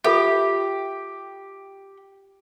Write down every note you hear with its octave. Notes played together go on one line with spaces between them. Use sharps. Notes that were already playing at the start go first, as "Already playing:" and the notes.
F4 G4 A4 E5